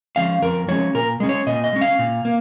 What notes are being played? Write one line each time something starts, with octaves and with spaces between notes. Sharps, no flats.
F3 G#3 C#4 F5
F2 A#4
F3 G#3 C#4 C#5
A#2 A#4
G#3 C#4
C#5
A#2 D#5
D#5
G#3 C#4
F5
A#2
A#3